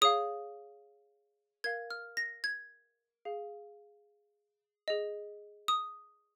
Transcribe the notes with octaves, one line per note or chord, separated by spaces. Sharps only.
G#4 C#5 F5 D#6
A#4 F5 G#6
F6
A#6
G#6
G#4 F5
G#4 D#5
D#6